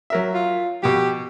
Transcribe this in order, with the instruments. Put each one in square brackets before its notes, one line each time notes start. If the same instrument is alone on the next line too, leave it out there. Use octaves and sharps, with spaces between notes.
[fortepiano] F#3 A#4 E5
[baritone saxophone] F4
[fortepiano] B2 F3 [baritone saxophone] G4